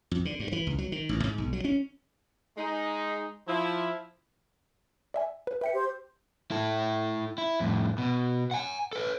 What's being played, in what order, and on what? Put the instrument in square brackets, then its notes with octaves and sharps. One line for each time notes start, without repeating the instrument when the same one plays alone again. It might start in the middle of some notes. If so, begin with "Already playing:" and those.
[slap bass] F2
D3
G2
E3
C#2
F#3
D#3
A1
G#2
B1
F#3
C#4
[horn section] G#3 D#4
F3 E4
[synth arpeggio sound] D5 E5 G#5
B4
[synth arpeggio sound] B4 G5 C#7 [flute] E5
[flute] G4 [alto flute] C5
[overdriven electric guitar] E4 A4
E4
F2 A2
B2
F#5 G#5
A4 B4